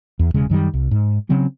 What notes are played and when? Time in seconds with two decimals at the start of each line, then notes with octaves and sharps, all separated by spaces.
0.19 E2
0.34 E1 C#3 G#3
0.50 F#2 D#3 F#3 G3
0.74 C2
0.91 G#2
1.29 C#3 F#3 C4 C#4